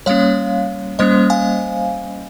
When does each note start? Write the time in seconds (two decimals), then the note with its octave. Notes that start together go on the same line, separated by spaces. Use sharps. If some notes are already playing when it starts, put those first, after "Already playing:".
0.06 G3 A#3 C#4 C#5 F5
0.99 G3 A#3 C#4 C5 D#5
1.30 F5 G#5